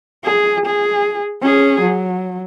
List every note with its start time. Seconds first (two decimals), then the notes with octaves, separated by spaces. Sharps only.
0.24 G#4
0.66 G#4
1.41 C#4 G#4
1.81 F#3